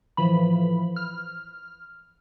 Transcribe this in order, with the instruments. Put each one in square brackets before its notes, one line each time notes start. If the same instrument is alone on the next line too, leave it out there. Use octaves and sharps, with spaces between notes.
[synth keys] A2 E3 F3 B5
F6